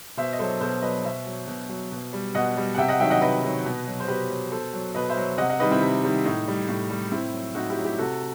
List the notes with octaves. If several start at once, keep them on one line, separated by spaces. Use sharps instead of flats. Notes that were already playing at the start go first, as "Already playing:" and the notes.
B2 C5 E5
D#5
F#3 A4 C5
B2 A4 C5
F#3 B4 D#5
B2 C5 E5
F#3
B2
F#3
B2
G3
B2 D#5 F#5
G3
F#5
C3 E5 G5
D#5 F#5
D#3 F#3 E5 G5
D#5 F#5
C3 B4 D#5
D#3 F#3
B2
F#3
C5
B2 G4 B4
F#3
B2 A4 C5
F#3
B2 B4 D#5
C5 E5
F#3
C3 D#5 F#5
D#5 F#5
D#3 G3 B4 D#5
C4 E4
C3
D#3 G3
A2 D#4
G3
A2
G3
A2 C4 E4
F#3
A2 D#4 F#4
E4 G4
F#3
E4 G4
C3 F#4 A4